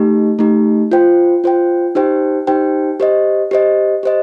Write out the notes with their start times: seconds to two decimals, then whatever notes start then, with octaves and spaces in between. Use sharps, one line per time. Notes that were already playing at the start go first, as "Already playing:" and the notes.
Already playing: A3 D#4 G4
0.39 A3 D#4 G4
0.92 F4 C5 G5
1.44 F4 C5 G5
1.95 D#4 G4 C5 G5
2.47 D#4 G4 C5 G5
3.00 G4 C5 D#5
3.51 G4 C5 D#5
4.03 G4 C5 D#5